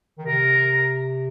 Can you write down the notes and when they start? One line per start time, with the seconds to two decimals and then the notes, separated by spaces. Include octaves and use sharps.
0.18 D#3
0.26 C3 A#4